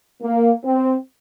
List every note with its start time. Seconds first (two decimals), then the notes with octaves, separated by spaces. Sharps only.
0.22 A#3
0.65 C4